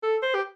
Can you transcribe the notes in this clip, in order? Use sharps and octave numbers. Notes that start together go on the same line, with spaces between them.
A4
C5
G4